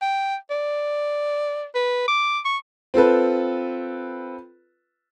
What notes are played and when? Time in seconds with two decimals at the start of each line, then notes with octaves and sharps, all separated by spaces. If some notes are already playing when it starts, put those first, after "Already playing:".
0.02 G5
0.51 D5
1.75 B4
2.08 D6
2.45 C#6
2.94 C4 F4 A4 B4